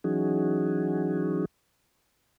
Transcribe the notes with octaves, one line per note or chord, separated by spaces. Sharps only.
E3 F#3 C#4 D#4 F#4 G#4